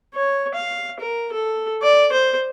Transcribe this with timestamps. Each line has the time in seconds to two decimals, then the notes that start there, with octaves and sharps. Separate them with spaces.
0.14 C#5
0.55 F5
1.00 A#4
1.33 A4
1.82 D5
2.13 C5